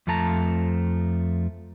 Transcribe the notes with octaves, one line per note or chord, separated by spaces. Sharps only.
F2 F3 A3 A5 A#5